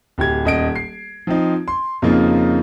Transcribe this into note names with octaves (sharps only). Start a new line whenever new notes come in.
D1 G4 G#6
D#1 D#5 D7
C7
F3 C4 D#4
C6
F2 C#3 F3 A#3 D#4 F4